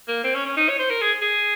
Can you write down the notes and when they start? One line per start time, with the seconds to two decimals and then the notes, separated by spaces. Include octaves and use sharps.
0.08 A#3
0.24 C4
0.35 C#4
0.46 C#4
0.57 D#4
0.69 C#5
0.79 C5
0.90 A#4
1.01 G#4
1.22 G#4